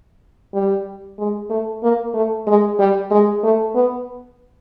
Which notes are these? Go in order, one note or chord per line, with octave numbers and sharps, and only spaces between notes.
G3
G#3
A3
A#3
A3
G#3
G3
G#3
A3
B3